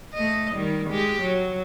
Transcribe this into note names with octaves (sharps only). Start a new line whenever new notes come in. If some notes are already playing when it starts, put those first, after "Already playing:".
A3 D#5
D#3 G3
G#3 G4
F#3